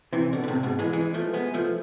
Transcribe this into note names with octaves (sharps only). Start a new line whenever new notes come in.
C3 E3
B2 D3
D3
A2 C3
G#2 B2
E3 G#3
E3 G#3
F3 A3
G#3 B3
F3 A3